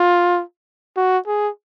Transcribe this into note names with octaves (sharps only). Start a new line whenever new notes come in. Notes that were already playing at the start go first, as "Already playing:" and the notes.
Already playing: F4
F#4
G#4